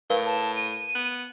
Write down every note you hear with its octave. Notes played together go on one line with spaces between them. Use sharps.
A2 A#4 B4 F5
A5
D#7
B3